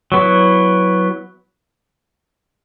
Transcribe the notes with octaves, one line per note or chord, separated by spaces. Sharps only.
F#3 B3 E4